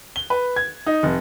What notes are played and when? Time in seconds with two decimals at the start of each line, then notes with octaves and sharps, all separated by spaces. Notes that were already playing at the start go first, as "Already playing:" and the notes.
0.16 G7
0.30 B4
0.56 G#6
0.86 D#4
1.03 F1